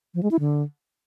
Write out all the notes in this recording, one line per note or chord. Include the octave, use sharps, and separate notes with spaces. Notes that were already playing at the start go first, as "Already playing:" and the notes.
F3
G#3
E4
D3